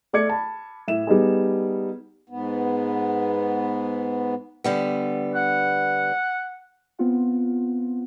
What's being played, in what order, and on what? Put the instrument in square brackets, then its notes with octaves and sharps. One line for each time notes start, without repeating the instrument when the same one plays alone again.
[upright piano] A3 D5 D6 G#6 C#7
A5 B5
A2 E5 E7
G3 B3 D#4 G#4
[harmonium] G#2 B3
[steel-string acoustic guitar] D3 G3 B3
[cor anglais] F#5
[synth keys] B3 C4 F4 F#5